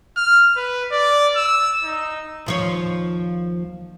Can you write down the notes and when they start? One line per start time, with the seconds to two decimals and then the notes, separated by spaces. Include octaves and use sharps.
0.17 F6
0.56 B4
0.92 D5
1.36 E6
1.84 D#4
2.46 D#2 F3 C#5